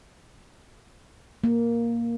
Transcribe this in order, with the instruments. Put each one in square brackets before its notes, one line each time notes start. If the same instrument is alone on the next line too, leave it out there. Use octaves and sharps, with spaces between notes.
[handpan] A#3